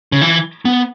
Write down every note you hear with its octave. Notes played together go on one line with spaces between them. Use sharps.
C#3
E3
B3